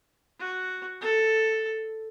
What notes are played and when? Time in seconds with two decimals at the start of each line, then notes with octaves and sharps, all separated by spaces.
0.40 F#4
1.01 A4